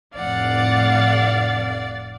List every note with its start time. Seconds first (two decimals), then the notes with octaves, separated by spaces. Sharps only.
0.15 F1 A2 D5 F5 F#5